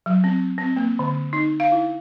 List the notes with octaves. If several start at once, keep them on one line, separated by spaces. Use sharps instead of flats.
F#3
C4
C4
A#3
D3
D#4
F5
E4